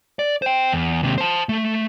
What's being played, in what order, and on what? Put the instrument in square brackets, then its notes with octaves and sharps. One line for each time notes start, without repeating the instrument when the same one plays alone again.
[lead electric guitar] D5
C5 G5
E2
D#2 C3
C5 A5
A3